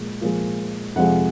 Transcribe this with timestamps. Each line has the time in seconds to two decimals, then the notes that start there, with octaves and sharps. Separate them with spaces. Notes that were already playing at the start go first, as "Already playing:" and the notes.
Already playing: A#2 F3 G#3
0.21 A#2 F3 G#3
0.95 F2 C3 F3 G#3 F#5